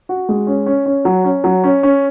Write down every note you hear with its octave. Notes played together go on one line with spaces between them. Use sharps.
F#4
G#3
C#4
C#4
C#4
F#3
C#4
F#3
C#4
C#4